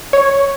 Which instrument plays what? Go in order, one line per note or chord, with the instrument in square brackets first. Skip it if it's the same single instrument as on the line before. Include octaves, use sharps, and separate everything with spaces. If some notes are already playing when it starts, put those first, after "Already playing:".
[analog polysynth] C#5